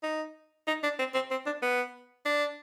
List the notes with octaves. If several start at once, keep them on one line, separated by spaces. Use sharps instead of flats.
D#4
D#4
D4
C4
C4
C4
D4
B3
D4